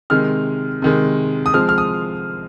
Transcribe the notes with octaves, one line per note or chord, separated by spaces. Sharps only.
C3 D#3 G#3 F6
C3 D#3 G#3
D#6
F3 G#3 C4 F6
F6
D#6